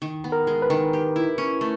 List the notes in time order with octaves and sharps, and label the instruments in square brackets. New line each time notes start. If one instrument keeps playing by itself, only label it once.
[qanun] D#3
B3
[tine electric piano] A#4
[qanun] G#3
[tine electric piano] B4
[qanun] D#3
G4
E4
C#4
A3